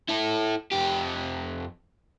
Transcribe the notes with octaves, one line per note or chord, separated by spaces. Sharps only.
E4 A4
F2 G4